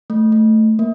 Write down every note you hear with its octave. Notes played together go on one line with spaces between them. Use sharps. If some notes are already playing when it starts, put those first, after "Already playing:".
A3
A3
A#3